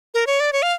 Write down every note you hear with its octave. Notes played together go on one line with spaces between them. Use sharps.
A#4
C#5
D5
C#5
F5